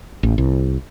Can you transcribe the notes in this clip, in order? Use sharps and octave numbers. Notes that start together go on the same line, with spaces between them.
A1
C2